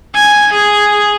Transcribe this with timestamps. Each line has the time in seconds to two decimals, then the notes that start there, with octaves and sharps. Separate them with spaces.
0.15 G#5
0.52 G#4